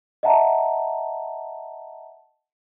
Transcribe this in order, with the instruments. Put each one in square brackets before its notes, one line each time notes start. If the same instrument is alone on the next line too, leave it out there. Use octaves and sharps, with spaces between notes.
[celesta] D#5 E5 F#5 A5 A#5